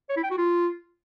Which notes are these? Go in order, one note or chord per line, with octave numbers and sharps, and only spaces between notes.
C#5
E4
G5
F#4
F4